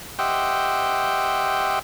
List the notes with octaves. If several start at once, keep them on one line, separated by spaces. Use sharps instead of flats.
G4 C5 D#5 E5 F#5 G5